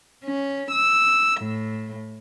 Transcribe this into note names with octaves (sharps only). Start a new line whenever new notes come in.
C#4
E6
A2